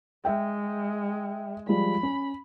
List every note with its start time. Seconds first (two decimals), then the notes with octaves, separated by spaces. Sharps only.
0.25 G#3 E5 G5
1.69 F3 G3 G#3 B5
2.03 C#4